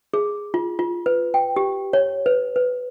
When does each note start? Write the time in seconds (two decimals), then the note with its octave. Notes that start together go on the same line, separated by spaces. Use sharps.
0.14 G#4
0.54 F4
0.79 F4
1.06 B4
1.34 G5
1.56 G4
1.93 C#5
2.26 B4
2.56 B4